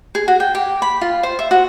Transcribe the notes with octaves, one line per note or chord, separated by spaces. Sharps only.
G#4
F#4
G5
G4
B5
F4
C5
E5
F#4